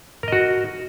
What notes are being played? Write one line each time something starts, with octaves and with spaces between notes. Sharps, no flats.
F#4 A#4 D#5